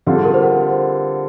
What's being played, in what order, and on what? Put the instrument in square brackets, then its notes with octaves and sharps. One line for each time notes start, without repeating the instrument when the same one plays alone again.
[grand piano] D3 G3 C4 F4 [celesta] G4
[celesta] G#4
A#4
C5
F#5